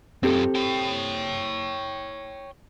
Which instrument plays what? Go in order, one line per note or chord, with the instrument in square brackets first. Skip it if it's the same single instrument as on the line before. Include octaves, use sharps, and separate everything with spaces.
[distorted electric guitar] F#2 F4 [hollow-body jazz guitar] C4 G4 A4
[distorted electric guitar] C#5 G5